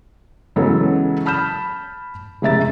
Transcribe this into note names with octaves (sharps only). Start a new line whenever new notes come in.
C#3 E3 F#3 G#3 B3 A4
A5 B5 F6 G6 E7
F1 C#3 G#3 E5 A#5 A6